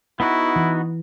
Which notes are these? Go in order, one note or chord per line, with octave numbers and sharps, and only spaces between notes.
B3 D#4 E4 F#4
E3